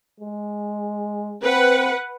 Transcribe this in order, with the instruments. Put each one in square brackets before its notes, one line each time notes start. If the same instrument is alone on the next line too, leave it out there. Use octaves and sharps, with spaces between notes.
[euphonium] G#3
[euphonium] C4 [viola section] B4 F#5